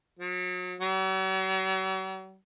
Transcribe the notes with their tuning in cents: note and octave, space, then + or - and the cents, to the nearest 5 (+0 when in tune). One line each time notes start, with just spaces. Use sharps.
F#3 -35
F#3 +45